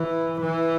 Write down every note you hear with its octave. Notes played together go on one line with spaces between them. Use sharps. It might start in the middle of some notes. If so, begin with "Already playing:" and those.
Already playing: E3
E3